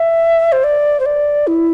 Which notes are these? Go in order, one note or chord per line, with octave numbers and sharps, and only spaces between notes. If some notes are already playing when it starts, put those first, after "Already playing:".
Already playing: E5
C5
D5
C5
D5
E4